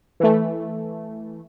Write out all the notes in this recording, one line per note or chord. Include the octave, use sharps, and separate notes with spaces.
E3 A3